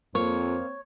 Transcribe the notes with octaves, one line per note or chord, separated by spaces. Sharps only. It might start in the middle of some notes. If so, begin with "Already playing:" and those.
F2 A#3 C4 C#5